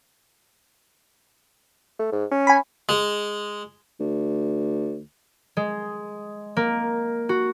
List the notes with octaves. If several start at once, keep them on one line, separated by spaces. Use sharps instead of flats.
A3
G#2
C#4
G#5 B5
G#3
D2
G#3
A#3
F#4